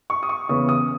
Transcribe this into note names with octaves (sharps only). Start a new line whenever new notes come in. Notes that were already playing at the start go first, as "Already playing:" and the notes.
C#6
D#6
C#6
E2 C#3 E3 B3 D#6
D#6